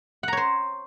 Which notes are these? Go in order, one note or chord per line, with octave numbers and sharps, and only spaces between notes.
C5 C#5 F#5 A#5